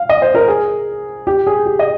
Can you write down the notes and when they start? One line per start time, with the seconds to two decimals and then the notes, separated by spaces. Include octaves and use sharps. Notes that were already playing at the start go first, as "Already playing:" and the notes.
Already playing: F5
0.09 D#5
0.22 C5
0.35 A#4
0.48 G#4
1.27 G4
1.47 G#4
1.66 G4
1.79 D#5